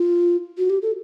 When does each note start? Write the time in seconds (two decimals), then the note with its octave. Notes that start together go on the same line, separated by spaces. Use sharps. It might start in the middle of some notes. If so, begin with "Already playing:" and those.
Already playing: F4
0.58 F#4
0.70 G4
0.82 A4